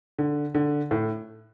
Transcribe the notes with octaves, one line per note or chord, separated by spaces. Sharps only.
D3
D3
A2